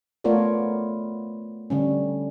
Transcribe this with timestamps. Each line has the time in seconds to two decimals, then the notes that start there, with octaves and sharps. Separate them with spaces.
0.24 A3 B3 F4 A#4 C#5 D5
1.70 D3 G3 C#4